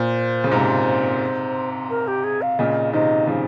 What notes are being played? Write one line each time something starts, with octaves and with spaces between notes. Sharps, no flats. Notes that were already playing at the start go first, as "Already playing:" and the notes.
Already playing: A#2 C5
C#3
G#2 C3
A#4
G4
G#4
F5
A#2 C#3 D#5
C3 D#3 D#5
C#3 F3